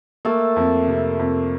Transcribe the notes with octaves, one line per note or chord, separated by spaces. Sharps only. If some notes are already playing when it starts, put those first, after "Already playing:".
A3 A#3 A4
F2
C3
F2